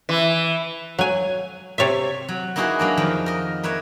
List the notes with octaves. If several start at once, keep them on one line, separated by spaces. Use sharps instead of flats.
E3
F#3 G#5
C3 C#5 D5 E5
F#3
A#3 D#4 E4 F#4 G#4 B4
F#3 A#3 D4
F2 D#3 F3
A#4 D#5
A#3 B4 C#5 E5